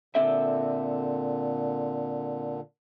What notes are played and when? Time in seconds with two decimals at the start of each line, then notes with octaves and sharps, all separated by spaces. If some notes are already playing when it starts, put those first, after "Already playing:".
0.15 A#2 D3 C4 A4 E5